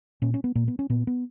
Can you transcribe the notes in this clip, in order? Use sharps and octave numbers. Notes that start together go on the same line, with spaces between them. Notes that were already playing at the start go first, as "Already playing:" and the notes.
A#2 C#4
C#4
B3
A#2 A#3
B3
C#4
A#2 B3
B3